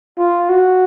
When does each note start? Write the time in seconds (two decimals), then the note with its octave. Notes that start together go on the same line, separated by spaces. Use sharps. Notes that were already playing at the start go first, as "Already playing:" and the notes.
0.18 F4
0.49 F#4